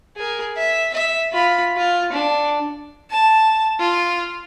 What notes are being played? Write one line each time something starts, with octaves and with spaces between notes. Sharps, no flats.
G#4 A#4
E5
E5
F4 B5
F4
D4
A5
F4